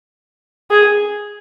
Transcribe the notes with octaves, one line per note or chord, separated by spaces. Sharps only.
G#4